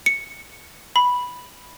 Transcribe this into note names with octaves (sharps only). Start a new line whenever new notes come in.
C#7
B5